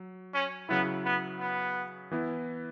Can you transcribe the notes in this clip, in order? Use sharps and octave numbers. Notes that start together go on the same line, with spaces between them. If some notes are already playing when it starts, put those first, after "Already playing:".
Already playing: F#3
C#4
C#3 F#3 B3 E4
B3
B3
E3 B3 E4